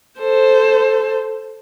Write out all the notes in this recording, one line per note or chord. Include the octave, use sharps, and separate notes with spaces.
A4 C5